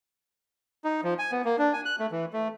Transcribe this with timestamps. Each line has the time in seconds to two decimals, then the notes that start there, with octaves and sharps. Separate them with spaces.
0.84 D#4
1.03 F3
1.19 G#5
1.32 B3
1.44 A#3
1.59 D4
1.73 G#5
1.85 F#6
1.99 A3
2.11 E3
2.33 A3